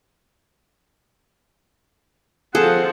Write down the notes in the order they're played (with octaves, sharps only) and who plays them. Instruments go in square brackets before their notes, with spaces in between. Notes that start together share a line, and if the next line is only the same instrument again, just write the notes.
[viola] F3 C4 [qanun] G#4 A4 [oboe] F#5